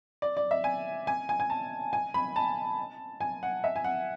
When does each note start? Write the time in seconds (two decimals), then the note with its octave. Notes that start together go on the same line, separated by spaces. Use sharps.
0.22 D5
0.37 D5
0.51 E5
0.64 G#5
1.07 G#5
1.29 G#5
1.40 G#5
1.50 A5
1.93 G#5
2.14 B5
2.36 A5
3.21 G#5
3.43 F#5
3.64 E5
3.76 G#5
3.84 F#5